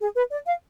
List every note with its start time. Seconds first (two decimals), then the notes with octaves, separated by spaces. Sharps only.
0.01 G#4
0.16 B4
0.31 D5
0.46 F5